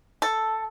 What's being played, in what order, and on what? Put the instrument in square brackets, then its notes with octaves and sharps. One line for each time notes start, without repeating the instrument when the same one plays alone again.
[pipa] A4